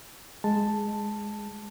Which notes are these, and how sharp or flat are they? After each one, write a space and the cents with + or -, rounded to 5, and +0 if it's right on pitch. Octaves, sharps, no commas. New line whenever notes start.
G#3 +0 A5 +0